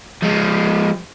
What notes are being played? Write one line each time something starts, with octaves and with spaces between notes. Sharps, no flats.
F3 G#3